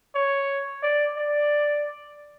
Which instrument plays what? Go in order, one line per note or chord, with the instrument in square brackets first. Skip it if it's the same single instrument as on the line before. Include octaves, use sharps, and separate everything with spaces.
[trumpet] C#5
D5
D5